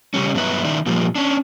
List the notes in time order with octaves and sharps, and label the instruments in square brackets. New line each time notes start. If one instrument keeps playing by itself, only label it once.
[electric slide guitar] C#3 G3 C#4
G2 F#3 B3 E4 B4
D#3 D#4 E4 D5
A#2 F3 G3 A#3
C#4 D4